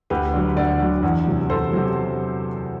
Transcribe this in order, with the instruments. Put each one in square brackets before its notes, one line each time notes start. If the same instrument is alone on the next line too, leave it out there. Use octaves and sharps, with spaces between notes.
[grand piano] D2 G4 B4
D3 F#3
D2 D5 F#5
D3 F#3
E2
C3 F#3
E2 A4 C5
C3 F#3